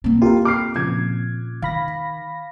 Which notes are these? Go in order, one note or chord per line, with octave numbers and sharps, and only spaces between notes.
B1 A#3 C4
F4 G4 A4 A#4
D6 F6 C7
A#2 C#3 F3 G#6
D#3 F5 B5 A#6